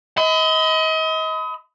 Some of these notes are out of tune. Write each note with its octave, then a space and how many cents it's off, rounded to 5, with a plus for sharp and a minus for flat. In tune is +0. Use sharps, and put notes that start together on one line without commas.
D#5 +35 B5 +40